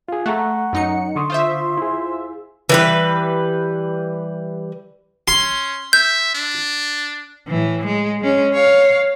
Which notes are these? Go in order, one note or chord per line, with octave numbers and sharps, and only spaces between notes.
F4 G#4 F5
A3 F#5 A#5 C#6 F#6
F#2 D#4 C#7
D3 C6 C#6 D#6
F4 C5 E5
E4 G#4
E3 G3 B4
C#4 C6
E5 G6
D4
A2 E3
G#3
G#3 C#4
C#5 F5